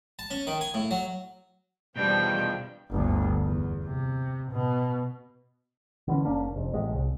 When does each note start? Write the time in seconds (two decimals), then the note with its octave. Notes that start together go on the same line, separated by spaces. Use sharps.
0.19 A5
0.31 C#4
0.47 D#3
0.61 G#5
0.74 A2
0.91 F#3
1.96 E2 B2 D#3 F3 G3 D4 G5
2.91 G1 D2
3.44 E2
3.84 C3
4.51 B2
6.08 D3 E3 C#4
6.25 F#1 A#3 C#4 D4
6.54 F1 F2
6.73 A1 G#3
6.92 C2